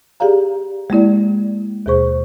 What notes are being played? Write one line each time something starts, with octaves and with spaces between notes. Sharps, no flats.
G4 G#4 D5 F5 A#5
G#3 A#3 E4 D5
D#2 B2 G#4 C5 C#6